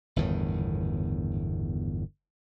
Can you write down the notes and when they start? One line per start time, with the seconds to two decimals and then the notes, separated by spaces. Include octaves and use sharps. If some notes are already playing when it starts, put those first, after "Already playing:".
0.16 G1 E2 A2 D#3